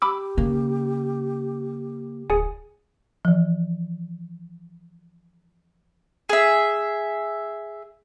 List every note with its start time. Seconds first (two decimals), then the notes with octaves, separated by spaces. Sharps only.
0.02 G4 B5 D6 E6
0.38 C#3 A#3
2.30 D1 G#4 G#5
3.25 E3 F3
6.29 G#4 E5